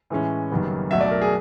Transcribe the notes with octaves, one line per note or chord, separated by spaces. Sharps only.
A2 E3 G#3 C#4
F#1 F#2 D#3 G3 B3
B1 B2 F#3 A3 E5
D5
A#4
G#4